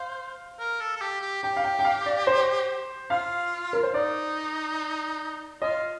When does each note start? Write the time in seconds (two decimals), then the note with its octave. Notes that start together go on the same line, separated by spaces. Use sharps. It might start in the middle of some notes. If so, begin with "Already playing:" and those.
Already playing: C5 F5
0.58 A#4
0.80 A4
0.96 A4
1.01 G4
1.21 G4
1.43 G4 G5
1.56 F5
1.64 G5
1.79 G5
1.85 F5
2.06 D5
2.27 C5
3.10 F4 F5
3.73 A#4
3.83 C5
3.94 D#4 D5
5.62 F4 D#5